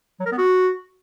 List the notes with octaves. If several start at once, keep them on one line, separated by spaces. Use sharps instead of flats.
F#3
A#4
B3
F#4